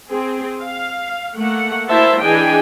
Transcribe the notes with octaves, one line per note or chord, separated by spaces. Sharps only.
C4 G#4
F5
A3 A#3 F#5
A#3 E4 F#4 C5 E5 A5
E3 D4 G#4 D#5 G5 G#5